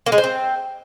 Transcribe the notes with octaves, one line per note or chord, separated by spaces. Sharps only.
A#3
G#3
C5
C4